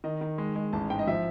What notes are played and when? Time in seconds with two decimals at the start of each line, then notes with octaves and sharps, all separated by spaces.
0.04 D#3 D#5
0.21 D#3
0.38 G#3
0.56 G#3
0.73 A1 A5
0.90 G#2 G5
0.99 D#5
1.07 F3 E5